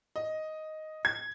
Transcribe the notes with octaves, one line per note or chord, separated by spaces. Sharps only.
D#5
G#6